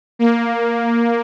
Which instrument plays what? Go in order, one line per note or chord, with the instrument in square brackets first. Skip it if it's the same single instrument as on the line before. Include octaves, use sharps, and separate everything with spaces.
[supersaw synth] A#3